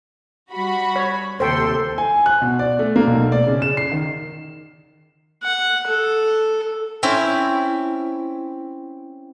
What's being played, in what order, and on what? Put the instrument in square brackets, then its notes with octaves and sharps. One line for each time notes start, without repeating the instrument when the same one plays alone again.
[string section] G3 F#4 B5
[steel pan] C#5
[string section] D#2 C3 C6 [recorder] A4 [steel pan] C5 G5
[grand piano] G#5
F#6
B2
D5
A3
A#3
B1
D5
C#3
E7
C7
D#3
[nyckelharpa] F#5
A4
[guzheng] C4 C#4 E4